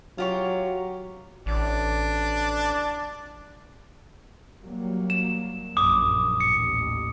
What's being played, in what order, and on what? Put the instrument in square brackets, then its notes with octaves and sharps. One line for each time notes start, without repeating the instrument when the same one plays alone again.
[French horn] F#3 [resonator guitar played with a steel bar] F4 G4 C#5
[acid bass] A1 [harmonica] D4
[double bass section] F#3 G3 A#3
[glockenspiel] E7
[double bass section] A#1 F#2 [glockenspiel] D6 D#6
[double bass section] A1 D#2 [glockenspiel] C#7